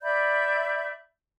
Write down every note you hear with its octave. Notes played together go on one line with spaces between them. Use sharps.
D5 E5 B5 G6